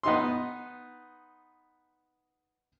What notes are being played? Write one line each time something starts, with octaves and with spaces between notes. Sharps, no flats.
B3 D#4 C6